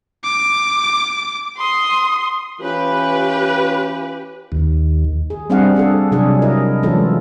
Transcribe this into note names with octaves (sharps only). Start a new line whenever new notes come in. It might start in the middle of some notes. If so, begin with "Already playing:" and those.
D6
C6 D#6
E3 C#4 F4 G4 B4
D#2
G#4
G3 C4 D4 G#4 F5 F#5
C4 D4 G#4 A4
C3 F#3 D4 G#4
E4 A#4 D#5
E3 F#3 G#3 C#4 F4 A4